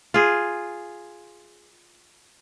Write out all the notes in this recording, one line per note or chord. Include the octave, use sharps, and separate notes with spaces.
F4 G#4